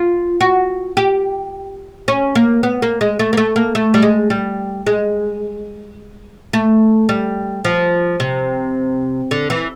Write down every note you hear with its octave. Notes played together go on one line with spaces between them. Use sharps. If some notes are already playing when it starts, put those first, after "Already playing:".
Already playing: F4
F#4
G4
C#4
A#3
B3
A#3
G#3
A3
A#3
A3
A#3
A3
G3
G#3
G3
G#3
A3
G3
F3
C3
D3
E3